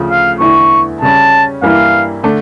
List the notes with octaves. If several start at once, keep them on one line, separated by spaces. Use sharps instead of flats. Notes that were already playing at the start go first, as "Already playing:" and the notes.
Already playing: D2 C#3 F3
F5
E2 D3 A3 E4 C#6
C#3 G3 C#4 A5
G2 E3 G3 A#3 E4 F5
D3 A3 D4